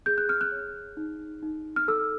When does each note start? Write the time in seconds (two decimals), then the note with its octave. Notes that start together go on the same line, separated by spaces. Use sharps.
0.06 G#4 G6
0.18 F#6
0.29 F6
0.41 F#6
0.52 C#5
0.97 D#4
1.42 D#4
1.76 F6
1.88 A4 E6